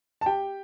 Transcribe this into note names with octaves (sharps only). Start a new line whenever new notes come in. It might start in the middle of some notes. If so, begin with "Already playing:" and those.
A5
G4 G5